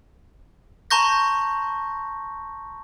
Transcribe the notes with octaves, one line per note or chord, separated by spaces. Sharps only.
A5 A#5 C6 C#6 G6 A#6